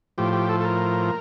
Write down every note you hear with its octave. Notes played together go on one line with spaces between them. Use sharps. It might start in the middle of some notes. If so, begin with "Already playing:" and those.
A2 F3 G4
G4
A4
A4
A#4